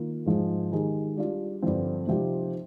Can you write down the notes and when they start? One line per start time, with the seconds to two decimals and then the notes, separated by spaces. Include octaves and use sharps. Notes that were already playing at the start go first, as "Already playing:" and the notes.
Already playing: D#3 A#3 F4
0.26 G#2 F3 G#3
0.72 D#3 G#3 D#4 G4
1.17 G3 D4 F4
1.62 G2 D3 F3 C4
2.07 C3 F3 C4 D#4 G4